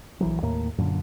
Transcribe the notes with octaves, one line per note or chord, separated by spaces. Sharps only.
A#1 E3 F#3
D#2 A2 A#3
F#2 A#2 D3